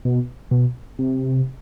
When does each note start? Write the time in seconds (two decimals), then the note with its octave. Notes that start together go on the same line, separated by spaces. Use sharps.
0.05 B2
0.51 B2
0.99 C3